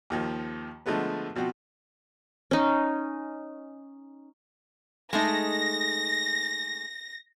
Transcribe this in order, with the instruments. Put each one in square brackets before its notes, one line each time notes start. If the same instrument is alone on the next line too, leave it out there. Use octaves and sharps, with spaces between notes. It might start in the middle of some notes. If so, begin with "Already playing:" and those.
[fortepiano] D#2 D#3 F3
D3 F3 G#3 A3 B3 B4
B2 F3 C4 F#4
[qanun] C#4 D#4
[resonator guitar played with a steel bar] G#3 A3 D#4 [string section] A#6